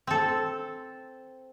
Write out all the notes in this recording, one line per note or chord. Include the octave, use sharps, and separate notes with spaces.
C4 A4